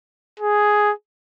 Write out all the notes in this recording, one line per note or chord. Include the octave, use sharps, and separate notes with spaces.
G#4